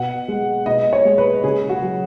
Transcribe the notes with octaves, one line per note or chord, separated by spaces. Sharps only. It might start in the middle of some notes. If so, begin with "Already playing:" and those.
Already playing: B2 F#5
G#3
B2 D#5
C#5
G#3
B4
C#3 G#4
F#4
F#3